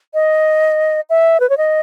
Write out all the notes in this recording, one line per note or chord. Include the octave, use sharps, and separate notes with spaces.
D#5
E5
B4
C#5
D#5